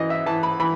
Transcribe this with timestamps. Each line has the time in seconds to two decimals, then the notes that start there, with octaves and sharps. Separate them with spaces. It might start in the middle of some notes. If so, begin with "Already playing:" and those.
Already playing: F#2 E3 D#5
0.10 E5
0.26 E3 A5
0.43 B5
0.60 E3 B5